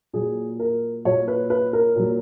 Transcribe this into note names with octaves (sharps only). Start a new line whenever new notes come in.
A#2 F#3 G#4
A#4
A#2 F#3 C#5
B4
B4
A#4
A#2 F#3